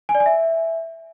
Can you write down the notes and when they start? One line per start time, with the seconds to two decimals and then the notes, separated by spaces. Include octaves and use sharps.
0.09 G#5
0.15 D5
0.20 G#5
0.26 E5